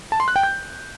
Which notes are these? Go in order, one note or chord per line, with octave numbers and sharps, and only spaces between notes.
A5
C6
F#6
G5
G6